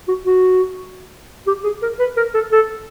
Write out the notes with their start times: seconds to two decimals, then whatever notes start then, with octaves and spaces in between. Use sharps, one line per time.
0.08 F#4
0.25 F#4
1.47 G4
1.64 G#4
1.82 A#4
1.99 B4
2.17 A#4
2.34 A4
2.52 A4